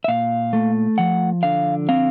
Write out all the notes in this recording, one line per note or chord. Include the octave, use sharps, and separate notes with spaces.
E5
A#2 F5
A3
F3 F#5
D3 F5
C4 F5